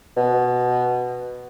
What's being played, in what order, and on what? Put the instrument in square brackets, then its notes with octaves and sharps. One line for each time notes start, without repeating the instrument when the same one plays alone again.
[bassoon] B2